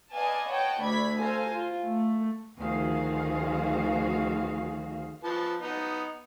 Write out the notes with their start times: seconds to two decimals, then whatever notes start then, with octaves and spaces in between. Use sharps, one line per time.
0.14 B4 D5 D#5 F5 G#5 A5
0.50 C#5 D#5 F#5 G5 A5
0.82 D2 A3 D5 B5 G#6 B6
1.21 A4 C5 F5 G#5 A#5
1.51 F4
1.86 A3
2.58 D2 D#3 F3 F#4 G#4 F5
5.24 F3 B4 A5
5.62 B3 D#4